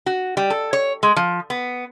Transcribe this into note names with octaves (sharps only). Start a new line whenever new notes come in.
F#4
G3
A4
C#5
G#3
F3
B3